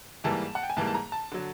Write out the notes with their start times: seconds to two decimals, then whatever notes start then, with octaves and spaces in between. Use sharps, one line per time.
0.24 G#2 E3 G3 A#3 A5
0.55 F#5
0.63 G5
0.70 G#5
0.77 G#2 E3 G3 A#3 A5
0.87 A5
0.94 A#5
1.12 A5
1.32 D3 F#3